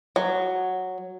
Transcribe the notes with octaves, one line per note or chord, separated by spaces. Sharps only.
F#3